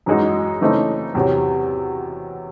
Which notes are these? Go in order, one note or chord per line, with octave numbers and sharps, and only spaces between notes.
F#2 E3 G#3 D#4 F#4
C#3 E3 A3 C4 D#4
E2 C3 F#3